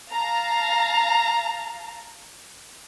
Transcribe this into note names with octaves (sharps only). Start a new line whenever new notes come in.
F5 A5 A#5